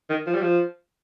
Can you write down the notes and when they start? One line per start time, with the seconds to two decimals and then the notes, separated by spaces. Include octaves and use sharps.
0.10 D#3
0.27 F3
0.34 G3
0.42 F3